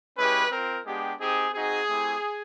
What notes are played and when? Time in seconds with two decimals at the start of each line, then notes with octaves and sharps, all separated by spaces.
0.17 G#3 C#4 E4 G4 B4
0.51 C4 F4 A#4
0.85 G#3 B3 D4 G4
1.19 C4 D#4 G4 G#4
1.53 C4 D#4 F#4 G#4
1.88 A3 C4 E4 G4